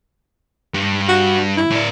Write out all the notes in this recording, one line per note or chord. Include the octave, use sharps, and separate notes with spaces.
G2
F#4
E4
A2 D5